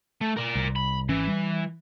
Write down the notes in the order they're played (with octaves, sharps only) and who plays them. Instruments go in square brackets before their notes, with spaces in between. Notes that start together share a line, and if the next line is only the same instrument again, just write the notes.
[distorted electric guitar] A3
A#4 D5
[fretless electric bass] C2
[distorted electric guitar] B5
[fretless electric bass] G#1 C#4 [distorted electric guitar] E3
[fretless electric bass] G3